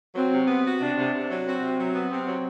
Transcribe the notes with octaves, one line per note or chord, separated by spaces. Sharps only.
F#3 C4
C3
B3
F#4
C3 D4
C3
C3
F#3
C4 F#4
C3
F#3
B3
C3 C4
F#3